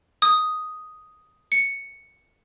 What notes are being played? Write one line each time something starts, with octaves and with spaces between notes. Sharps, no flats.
D#6
C#7